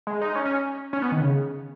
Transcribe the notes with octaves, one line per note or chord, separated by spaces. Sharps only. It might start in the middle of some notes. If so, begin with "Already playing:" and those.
G#3
D#4
C#4
C#4
C#4
B3
D#3
C#3